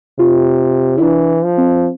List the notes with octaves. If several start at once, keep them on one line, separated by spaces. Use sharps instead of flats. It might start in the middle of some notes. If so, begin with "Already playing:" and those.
C3 F4
E4
E3 D4
F3
C4